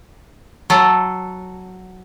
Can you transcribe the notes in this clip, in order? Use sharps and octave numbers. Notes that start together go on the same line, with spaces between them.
F#3 A4